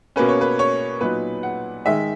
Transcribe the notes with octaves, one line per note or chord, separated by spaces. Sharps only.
B2 A#3 C#4 B4
C#5
B4
C#5
A#2 F#3 B3 D#4 B4
F#5
D#3 G#3 D#4 E5